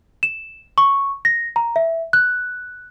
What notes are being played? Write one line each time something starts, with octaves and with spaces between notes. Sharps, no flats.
E7
C#6
A#6
A#5
E5
F#6